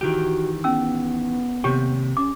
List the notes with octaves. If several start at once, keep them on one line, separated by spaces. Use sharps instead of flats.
D#3 E3 F#4 G4
B3 C#4 E6
D#2 C3 G4 C#5 G5
C#4 D6